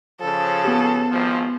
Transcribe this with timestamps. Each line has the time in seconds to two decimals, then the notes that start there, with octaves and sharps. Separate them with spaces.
0.20 C#3 F3 A4
0.65 B3 G4
1.11 G#1 F3